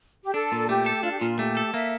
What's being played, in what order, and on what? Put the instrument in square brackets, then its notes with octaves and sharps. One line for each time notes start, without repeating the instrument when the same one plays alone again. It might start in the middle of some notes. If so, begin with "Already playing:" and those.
[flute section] G4
[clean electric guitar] D4 [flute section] A4
[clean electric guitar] A#2
[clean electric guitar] A3 [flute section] G4
[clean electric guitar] A4
[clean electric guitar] D4 [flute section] F4
[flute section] G4
[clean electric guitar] A#2 [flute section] F4
[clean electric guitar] A3 [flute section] G4
[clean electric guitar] A4
[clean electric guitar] A#3 [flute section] E5